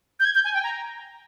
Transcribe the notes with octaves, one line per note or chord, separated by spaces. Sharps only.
G6
G#6
G6
G#5
G5
A#5